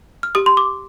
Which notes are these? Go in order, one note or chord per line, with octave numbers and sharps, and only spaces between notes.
F6
G4 D#6
C6
D6